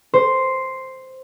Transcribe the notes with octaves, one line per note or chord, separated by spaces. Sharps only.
C5